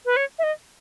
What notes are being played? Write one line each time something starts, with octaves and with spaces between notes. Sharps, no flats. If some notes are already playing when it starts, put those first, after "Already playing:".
B4
C#5
E5
D#5